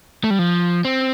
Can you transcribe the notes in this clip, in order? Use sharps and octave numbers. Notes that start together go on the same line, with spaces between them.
A3
G3
F3
C4